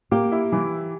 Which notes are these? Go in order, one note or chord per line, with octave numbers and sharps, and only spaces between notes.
A#3 G4
E4
E3